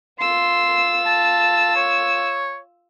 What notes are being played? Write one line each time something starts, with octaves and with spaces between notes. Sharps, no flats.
F4 C6 E6
A5
C#5